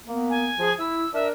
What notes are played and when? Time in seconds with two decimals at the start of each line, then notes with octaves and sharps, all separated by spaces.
0.07 A#3 B3
0.30 G#5
0.59 F3 G#4
0.79 E4 E6
1.14 D4 A#4 E5